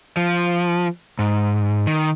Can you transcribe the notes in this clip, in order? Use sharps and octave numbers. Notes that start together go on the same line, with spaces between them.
F3
G#2
D#3